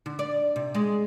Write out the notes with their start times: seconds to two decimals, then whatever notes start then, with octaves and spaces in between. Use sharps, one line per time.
0.06 D3
0.19 D5
0.56 C3
0.75 G#3